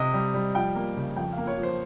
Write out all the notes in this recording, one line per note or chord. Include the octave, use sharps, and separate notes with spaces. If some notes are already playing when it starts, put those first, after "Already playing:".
Already playing: C3 D#5
G3
G3
F3 G5
A#3
C#3
F2 G5
A#3 F5
C#5
F3
C5